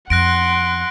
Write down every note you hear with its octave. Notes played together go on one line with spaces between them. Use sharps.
F2 F#5 C6 F#6 A#6 D7